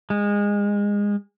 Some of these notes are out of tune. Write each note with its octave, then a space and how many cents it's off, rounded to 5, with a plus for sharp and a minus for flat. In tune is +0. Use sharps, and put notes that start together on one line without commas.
G#3 -25